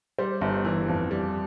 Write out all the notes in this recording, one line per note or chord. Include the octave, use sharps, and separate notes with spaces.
G3 C5
G1
E3
F2
G3